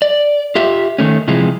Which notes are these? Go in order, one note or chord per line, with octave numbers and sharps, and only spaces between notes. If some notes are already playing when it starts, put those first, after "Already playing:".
D5
F4 G4 E5
D#3 E3 A3 C#4
C3 E3 F3 G#3